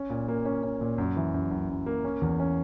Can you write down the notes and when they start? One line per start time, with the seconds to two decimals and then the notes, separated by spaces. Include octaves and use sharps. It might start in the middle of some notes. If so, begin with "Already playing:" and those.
Already playing: C#4
0.10 A#2
0.28 A#3
0.45 C#4
0.63 C#4
0.81 A#2
0.98 F#2
1.16 E3
1.34 F#2
1.51 F#2
1.69 F#2
1.86 A#3
2.05 C#4
2.22 E2
2.40 C#4